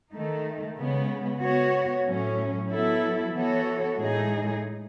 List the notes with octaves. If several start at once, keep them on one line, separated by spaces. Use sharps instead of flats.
D#3 A3 D#4
C#3 G#3 B3
B3 F#4 C#5
A2 F#3 C#4
F#3 B3 E4 A4
E3 B3 F#4 A4 C#5
A2 G#3 D#4 G#4